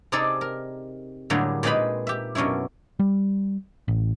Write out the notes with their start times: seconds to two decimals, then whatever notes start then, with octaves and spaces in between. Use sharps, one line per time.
0.12 C3 C4 D#4 G#4 A4 D5
0.41 A#4
1.30 A2 D3 F#3 G3 A#3 G#4
1.63 A#2 G#3 C4 D#4 B4 B5
2.07 G4 E5
2.35 F#2 B2 C#4 D4 E4
3.00 G3
3.88 A1